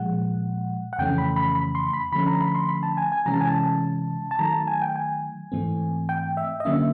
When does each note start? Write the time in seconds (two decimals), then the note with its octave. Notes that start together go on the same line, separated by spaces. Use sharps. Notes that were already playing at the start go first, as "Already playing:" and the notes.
Already playing: A#2 F3 G#3 F#5
0.93 F#5
0.99 F2 C#3 E3 A3 C#4 G5
1.18 B5
1.36 B5
1.55 B5
1.75 C6
1.93 B5
2.12 D3 F3 A3 C#4 B5
2.27 A#5
2.41 B5
2.55 C6
2.69 B5
2.83 A5
2.97 G#5
3.12 G#5
3.26 C3 E3 G#3 C#4 A#5
3.34 A5
3.41 G#5
3.48 A5
4.31 A5
4.39 D#3 F#3 A3 A#5
4.53 A5
4.67 G#5
4.82 G5
4.96 G#5
5.52 G#2 E3 A3 C4
6.09 G5
6.37 E5
6.60 D#5
6.65 D3 F#3 A#3 C#4 E5